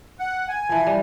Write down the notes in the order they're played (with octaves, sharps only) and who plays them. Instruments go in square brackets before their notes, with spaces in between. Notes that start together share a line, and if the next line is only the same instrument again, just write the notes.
[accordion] F#5
G#5
[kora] E3 F3
G3